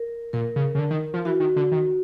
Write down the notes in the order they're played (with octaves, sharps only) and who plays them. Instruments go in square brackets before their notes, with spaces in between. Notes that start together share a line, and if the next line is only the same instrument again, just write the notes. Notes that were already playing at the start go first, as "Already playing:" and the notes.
Already playing: [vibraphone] A#4
[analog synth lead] A#2 [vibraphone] A#4
[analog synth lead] C#3
C#3
D3
D#3
F3
[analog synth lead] E3 [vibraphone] F#4
[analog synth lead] D#3
D3
D#3